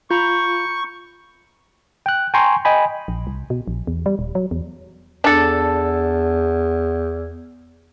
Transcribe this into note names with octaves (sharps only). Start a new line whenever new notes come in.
F4 A#5 B5 C#6 G6
G5 F#6
G5 G#5 A#5 C6 C#6
D#5 G5 G#5 B5
A#1
C2
B2
A#1
E2
G3
D#1
F#3
E2
E2 D4 A4